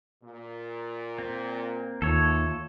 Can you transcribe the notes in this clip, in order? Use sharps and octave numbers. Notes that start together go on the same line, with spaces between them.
A#2
A#3 C4
D#2 A3 F4 A4 C#5